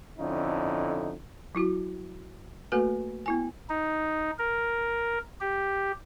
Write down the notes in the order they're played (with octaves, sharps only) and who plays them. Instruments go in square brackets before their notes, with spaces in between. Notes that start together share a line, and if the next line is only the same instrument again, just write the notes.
[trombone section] F2 D3 C#4 D#4 E4
[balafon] F#3 E4 F#4
A3 A#3 F#4 A4 B4 G#5
B3 E4 G#5
[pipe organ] D#4
A#4
G4